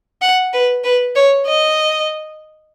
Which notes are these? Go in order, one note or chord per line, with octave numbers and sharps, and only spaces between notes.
F#5
B4
B4
C#5
D#5